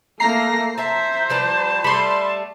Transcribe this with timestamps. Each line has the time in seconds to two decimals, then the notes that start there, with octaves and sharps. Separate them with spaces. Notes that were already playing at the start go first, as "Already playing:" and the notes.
0.20 A3 A#3 A#5 A#6 C7
0.78 C5 E5 A5
1.30 F3 G3 B4 A5
1.84 G3 A3 B5 C6